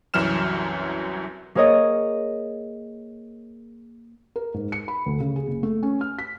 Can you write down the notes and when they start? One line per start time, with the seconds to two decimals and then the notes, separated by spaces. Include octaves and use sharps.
0.14 C2 F#2 E3 F#3 F6 E7
1.55 A#3 G#4 A#4 C#5 D#5
4.36 A#4
4.54 G#2
4.72 C#7
4.88 B5
5.06 D2
5.20 C#3
5.36 G#4
5.47 F#1
5.63 A3
5.83 C#4
6.01 F6
6.19 B6